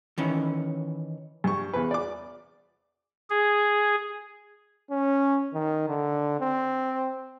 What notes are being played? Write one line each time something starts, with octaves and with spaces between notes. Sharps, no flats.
D#3 E3 C#4
G2 C#6
E2 B4
D5 D6
G#4
C#4
D#3
D3
C4